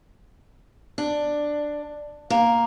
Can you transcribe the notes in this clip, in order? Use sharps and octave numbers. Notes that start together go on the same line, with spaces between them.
D4
A#3